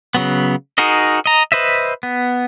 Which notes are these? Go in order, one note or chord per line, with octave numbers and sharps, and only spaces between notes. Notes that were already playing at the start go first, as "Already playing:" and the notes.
C#3 F#3 B3
D#4 F#4 G#4 A#4 D#5
D#5 A#5
B4 C5 D#5 E5
B3